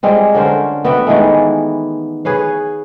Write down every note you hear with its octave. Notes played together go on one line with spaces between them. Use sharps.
G3 G#3 C4 F4
D3 C#4 A#4 C5
B3 F#4 E5 G5
D#3 E3 G#3 A3
G#4 B4 C#5 F5